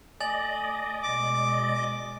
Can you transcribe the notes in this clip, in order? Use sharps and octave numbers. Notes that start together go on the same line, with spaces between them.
A3 D5 D#5 G#5 A6 F#7
B2 G#3 D6